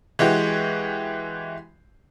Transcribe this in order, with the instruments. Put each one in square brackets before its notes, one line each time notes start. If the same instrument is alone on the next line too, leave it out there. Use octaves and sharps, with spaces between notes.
[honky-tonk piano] E3 G#3 F#4 G4